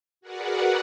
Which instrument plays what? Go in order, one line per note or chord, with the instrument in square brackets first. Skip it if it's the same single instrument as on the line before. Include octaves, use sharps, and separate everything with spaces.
[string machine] F#4 G#4 A#4 B4 D5 F#5